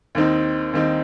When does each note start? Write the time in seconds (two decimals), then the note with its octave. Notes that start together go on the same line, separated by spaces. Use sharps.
0.15 D#2 D#3 C4 D#4
0.73 D#2 D#3 C4 D#4